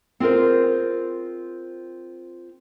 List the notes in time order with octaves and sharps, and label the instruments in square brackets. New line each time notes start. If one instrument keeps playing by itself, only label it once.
[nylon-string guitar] C4 F4 G#4 A#4 C5